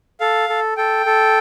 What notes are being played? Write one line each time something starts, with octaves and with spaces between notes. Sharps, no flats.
A4 F5
A4
A4 G5
A4